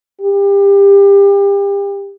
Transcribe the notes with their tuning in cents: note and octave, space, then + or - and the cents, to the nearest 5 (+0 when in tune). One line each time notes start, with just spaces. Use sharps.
G4 +30